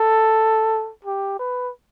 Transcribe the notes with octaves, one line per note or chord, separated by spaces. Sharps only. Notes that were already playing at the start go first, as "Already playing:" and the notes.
Already playing: A4
G4
B4